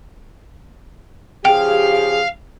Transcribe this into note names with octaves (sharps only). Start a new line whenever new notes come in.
C#3 F3 G4 G#4 F5 G5